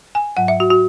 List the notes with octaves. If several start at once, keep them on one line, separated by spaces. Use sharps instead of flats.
G#5
G#2 F#3 F#5
E5
F#4
F#4